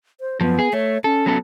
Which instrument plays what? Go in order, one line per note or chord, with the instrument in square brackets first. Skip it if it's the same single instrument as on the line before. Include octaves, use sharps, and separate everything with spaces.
[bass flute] C5
[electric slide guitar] F#2 F3 [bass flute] B3
[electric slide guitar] G#4
[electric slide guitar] A3 [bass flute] C#5
[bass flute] C#4 [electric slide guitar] A4
[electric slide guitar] F#3 B3 A4